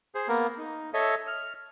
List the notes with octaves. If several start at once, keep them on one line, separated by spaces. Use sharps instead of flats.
G#4 C5
A#3 B3 A#4
D#4
A4 C#5 D#5 E5
F6